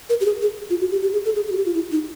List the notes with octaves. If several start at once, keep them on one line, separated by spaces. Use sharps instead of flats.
A#4
G4
G#4
G#4
F4
F#4
G4
G4
G#4
A4
G#4
G#4
F#4
G4
F4
E4
D#4